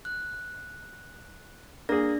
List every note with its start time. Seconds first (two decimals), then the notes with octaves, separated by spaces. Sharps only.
0.05 F#6
1.89 A#3 D4 G#4 D5 A#6